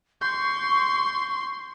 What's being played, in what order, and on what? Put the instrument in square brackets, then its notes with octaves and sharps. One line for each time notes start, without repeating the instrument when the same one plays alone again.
[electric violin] C6 [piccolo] C#6 [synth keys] G6